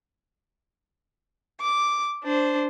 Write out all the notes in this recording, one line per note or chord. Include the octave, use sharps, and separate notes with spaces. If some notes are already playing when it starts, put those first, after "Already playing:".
D6
D4 C5